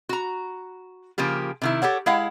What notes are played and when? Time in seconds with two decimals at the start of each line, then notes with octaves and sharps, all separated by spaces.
0.09 F#4 A#5
1.18 C#3 F3 A#3 G4
1.62 C3 D#3 E4
1.82 G4 A4 C#5 F#5
2.06 G#3 E4 F5 F#5